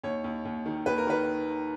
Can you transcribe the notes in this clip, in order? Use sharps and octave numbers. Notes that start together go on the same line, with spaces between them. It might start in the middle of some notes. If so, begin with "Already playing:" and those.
D#2 C#5
D#2
D#2
D#3
D#2 B4
A#4
D#3 B4